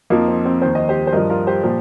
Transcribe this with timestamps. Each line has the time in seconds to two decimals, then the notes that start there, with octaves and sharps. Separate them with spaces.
0.10 F2 F3 A#3 D#4
0.28 C4
0.45 C4
0.62 D#2 D#3 C5
0.75 D#5
0.89 G4 C5
1.07 C5
1.12 G2 F3 A#4 D#5
1.30 F4 A#4
1.47 G4 C5
1.63 A#2 F3 G4 C5